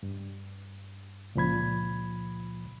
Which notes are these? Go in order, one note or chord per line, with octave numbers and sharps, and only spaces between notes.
G2
C#2 A#2 F3 B5 G#6